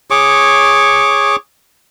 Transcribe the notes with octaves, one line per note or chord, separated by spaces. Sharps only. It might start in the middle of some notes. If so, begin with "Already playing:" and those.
G#4 C#5 C#6 D6